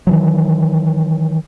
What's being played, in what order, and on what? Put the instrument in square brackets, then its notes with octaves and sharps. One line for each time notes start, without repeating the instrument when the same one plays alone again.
[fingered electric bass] D#3 E3 F#3